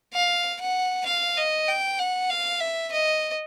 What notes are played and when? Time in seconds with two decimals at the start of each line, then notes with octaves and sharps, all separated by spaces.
0.13 F5
0.60 F#5
1.06 F5
1.37 D#5
1.68 G5
1.99 F#5
2.30 F5
2.60 E5
2.92 D#5